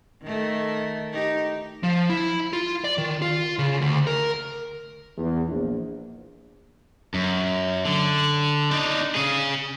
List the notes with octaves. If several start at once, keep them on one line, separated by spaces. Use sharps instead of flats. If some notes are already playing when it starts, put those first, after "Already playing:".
D#3 A3
D#4 G4
F3
E4
F4
D5
D#3
F4
C#3
D2
A#4
E2
A#1
F#2
D3
D4 D#4
C#3 G#4